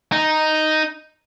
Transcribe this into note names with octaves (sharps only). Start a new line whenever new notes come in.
D#4